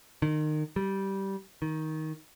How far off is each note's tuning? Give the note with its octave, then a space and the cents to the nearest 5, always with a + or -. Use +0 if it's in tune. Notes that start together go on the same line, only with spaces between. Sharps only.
D#3 -25
G3 -10
D#3 +15